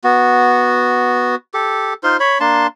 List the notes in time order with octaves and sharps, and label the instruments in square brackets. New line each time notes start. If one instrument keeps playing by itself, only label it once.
[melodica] B3 F#4
G4 A4
D#4 F4 C5 C6
C#5 B5
A#3 D4 A5 C6